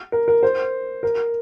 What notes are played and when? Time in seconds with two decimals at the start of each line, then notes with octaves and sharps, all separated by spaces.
0.12 A#4
0.28 A#4
0.43 C5
1.03 A#4